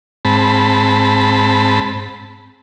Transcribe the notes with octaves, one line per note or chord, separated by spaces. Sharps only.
G#2 C4 A5 B5